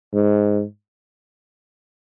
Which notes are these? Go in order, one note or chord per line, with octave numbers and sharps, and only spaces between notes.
G#2